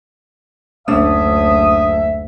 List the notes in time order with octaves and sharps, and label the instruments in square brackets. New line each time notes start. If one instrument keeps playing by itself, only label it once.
[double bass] F#1 D2 [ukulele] C#4 D4 [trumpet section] E5 [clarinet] D#6